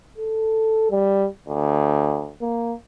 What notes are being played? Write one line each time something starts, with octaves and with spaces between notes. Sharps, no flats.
A4
G3
D2
A#3